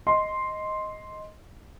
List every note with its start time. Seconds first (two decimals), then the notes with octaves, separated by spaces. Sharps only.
0.07 D#5 C6